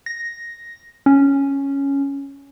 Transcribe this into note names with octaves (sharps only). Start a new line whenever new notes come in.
A#6
C#4